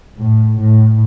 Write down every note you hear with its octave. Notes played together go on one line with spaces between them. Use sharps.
A2
A2